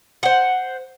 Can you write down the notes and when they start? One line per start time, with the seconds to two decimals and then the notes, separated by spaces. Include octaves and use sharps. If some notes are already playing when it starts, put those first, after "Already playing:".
0.23 C5 F#5